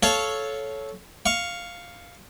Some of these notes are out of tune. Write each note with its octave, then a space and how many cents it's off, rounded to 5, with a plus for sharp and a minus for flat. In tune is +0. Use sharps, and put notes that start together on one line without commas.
A4 -15 C#5 +0 F5 +0
F5 +0 C#6 +0